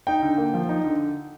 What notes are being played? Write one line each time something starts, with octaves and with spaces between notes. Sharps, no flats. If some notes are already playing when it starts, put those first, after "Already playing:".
D#4 G5
D3
A#3
F3
D#4
D3